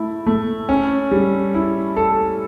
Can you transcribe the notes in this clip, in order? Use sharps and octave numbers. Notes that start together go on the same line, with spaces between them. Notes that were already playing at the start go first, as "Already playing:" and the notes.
Already playing: A3 E4
A3
C#4
G3
E4
A4